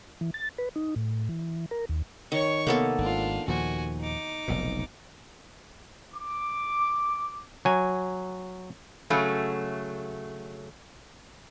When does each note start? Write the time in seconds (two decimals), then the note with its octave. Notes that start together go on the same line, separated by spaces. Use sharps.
0.21 E3
0.34 A6
0.58 B4
0.76 D#4
0.96 A2
1.29 E3
1.71 A#4
1.89 D#2
2.32 D#3 C#5 C#6
2.67 C3 A#3 B3 A4
2.98 G#1 D4 F4
3.48 D#2 A#2 F3 F#4 G#5
4.00 D#4 D6
4.48 F1 B1 A#2
6.14 D6
7.65 F#3 G#5
9.10 C#3 F#3 A3